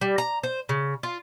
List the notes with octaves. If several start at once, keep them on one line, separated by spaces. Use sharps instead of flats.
G3
A#5
C5
C#3
F4